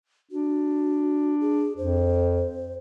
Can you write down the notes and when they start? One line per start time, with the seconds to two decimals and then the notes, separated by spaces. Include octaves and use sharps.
0.31 D4 F#4
1.41 G#4
1.77 F2 C5